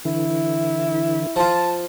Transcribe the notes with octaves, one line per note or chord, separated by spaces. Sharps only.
D3 E3 E4
F3 F4 A5